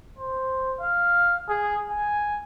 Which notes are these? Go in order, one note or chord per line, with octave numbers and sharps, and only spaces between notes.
C5
F5
G#4
G#5